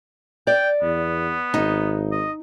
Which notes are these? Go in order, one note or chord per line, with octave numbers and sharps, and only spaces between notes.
D5 G5
E2 B3
G#1 D#4
D#5